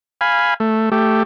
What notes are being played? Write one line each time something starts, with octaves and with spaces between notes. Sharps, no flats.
F5 G#5 B5
A3
A3 G4